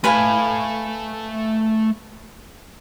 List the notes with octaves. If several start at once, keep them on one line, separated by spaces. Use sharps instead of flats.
A3 B4 F5 G#5 B5